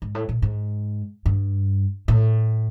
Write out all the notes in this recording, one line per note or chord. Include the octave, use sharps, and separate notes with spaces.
G#2
A2
A#2
G#2
G2
A2